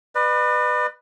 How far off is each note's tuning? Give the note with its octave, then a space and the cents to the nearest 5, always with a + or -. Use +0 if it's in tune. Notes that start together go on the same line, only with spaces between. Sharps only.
B4 +0 D5 +45